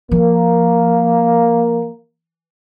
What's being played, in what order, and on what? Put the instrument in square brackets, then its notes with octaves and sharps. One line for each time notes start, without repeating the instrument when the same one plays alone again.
[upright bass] F3 [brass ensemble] A#3